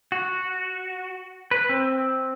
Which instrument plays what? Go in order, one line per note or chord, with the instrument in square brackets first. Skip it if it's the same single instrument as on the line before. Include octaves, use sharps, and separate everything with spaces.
[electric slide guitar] F#4
B4
C4